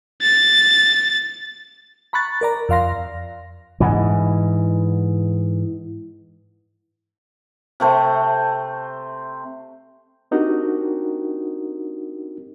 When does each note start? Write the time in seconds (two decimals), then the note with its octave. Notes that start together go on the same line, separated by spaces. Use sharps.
0.22 A6
2.13 A#5 B5 C#6 F#6 A6
2.41 A#4 D5 A#5
2.69 F2 D5 F5 C6 A#6
3.80 G#2 E3
7.80 C3 A3 C5
10.31 C4 D4 D#4 F#4 G4 A#4